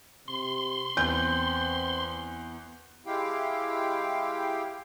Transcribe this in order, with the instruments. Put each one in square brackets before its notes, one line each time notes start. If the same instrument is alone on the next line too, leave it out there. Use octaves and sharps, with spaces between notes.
[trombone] C3 [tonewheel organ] C6
[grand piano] E2 [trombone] C4 [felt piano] G6
[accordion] G#3 E4 G4 F5 G5